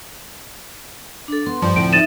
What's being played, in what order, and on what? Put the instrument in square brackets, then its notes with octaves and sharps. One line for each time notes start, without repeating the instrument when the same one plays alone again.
[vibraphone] D4 A4
[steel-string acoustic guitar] B3 [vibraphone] C6
[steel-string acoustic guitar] G2 G4 [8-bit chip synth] F3
[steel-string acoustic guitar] D2 A2 C4 [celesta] D7
[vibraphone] D#4 E5 [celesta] A6 D#7 E7